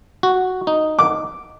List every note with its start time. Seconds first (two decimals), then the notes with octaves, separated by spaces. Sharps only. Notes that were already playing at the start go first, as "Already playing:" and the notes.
0.23 F#4
0.67 D#4
0.99 D6